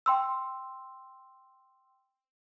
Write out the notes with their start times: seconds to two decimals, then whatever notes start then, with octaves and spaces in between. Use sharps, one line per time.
0.06 G5 C6 E6